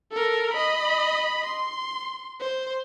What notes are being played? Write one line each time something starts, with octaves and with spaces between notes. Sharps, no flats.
A4 A#4
D#5 B5
C6
C5